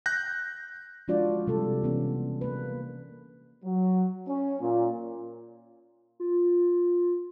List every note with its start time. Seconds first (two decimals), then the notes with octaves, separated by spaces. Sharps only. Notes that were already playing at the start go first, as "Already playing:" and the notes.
0.06 F#6 G6 A#6
1.08 F3 G#3 D4 F4 F#4 D5
1.47 C3 G3 A4
1.83 E3 B3 C#4
2.41 A#3 B4
3.65 F#3
4.27 C#4
4.60 A#2
6.20 F4